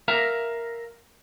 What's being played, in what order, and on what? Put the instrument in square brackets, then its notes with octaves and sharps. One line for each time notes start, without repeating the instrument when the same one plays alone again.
[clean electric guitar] A#4 E5 F5 A#5